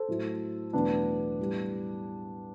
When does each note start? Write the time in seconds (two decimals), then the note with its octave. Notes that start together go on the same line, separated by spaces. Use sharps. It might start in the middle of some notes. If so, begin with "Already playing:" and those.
Already playing: A4 C5
0.08 A2 F#3 A3
0.73 E2 B2 F#3 A3 B3 D4
1.39 A2 G3